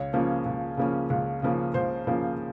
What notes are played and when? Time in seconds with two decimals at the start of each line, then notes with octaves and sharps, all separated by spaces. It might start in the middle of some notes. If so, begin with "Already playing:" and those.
Already playing: C#2 C#5
0.13 C#3 F3 A#3 C#4
0.46 C#2
0.77 C#3 F3 A#3 C#4
1.10 C#2
1.42 C#3 F3 A#3 C#4
1.74 C#2 C5
2.07 C#3 F3 A#3 C#4